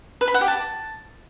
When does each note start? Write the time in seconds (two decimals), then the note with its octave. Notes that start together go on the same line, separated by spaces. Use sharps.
0.21 B4
0.28 B5
0.34 F#5
0.41 G4
0.48 A5